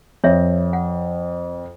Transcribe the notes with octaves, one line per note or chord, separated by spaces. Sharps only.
F2 C#5 E5
F#5